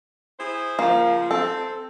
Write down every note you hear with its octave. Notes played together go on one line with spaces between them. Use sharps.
E4 G#4 C5
C#3 F3 A#3
C4 A4